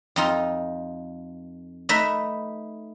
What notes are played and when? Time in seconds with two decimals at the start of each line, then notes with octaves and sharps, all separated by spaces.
0.16 F2 D#4 F4
1.89 A3 D#4 B4 D#5 E5